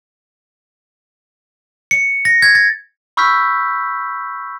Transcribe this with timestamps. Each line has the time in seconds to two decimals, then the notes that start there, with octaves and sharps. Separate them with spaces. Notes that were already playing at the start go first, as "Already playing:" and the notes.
1.91 C#7
2.25 A#6
2.42 G#6
2.55 A6
3.17 B5 C#6 E6 F6 G6 B6